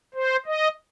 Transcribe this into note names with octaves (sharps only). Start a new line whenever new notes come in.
C5
D#5